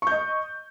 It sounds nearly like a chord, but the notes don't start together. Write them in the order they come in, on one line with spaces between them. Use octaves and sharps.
C#6 G6 D#5